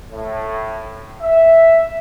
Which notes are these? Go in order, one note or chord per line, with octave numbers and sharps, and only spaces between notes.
A2
E5